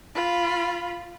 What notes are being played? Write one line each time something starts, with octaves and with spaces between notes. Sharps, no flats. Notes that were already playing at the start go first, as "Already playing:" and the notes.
F4 B5